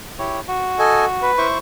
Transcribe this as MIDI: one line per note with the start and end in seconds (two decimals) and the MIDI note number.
0.19 0.40 64
0.19 0.40 67
0.19 0.40 73
0.48 1.31 66
0.79 1.05 69
0.79 1.05 75
0.79 1.05 80
1.22 1.47 71
1.38 1.58 64
1.38 1.58 72
1.38 1.58 85